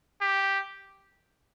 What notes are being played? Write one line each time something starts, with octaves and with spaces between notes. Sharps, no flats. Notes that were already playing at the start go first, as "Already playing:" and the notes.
G4